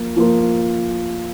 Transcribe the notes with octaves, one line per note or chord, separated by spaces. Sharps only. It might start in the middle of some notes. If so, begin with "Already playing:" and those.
Already playing: F3 A#3 F4
F3 A#3 F4 A#4